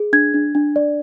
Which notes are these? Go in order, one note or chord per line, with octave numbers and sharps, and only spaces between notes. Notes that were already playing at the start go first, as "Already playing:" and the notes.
Already playing: G#4
D4 G#6
D4
D4
D5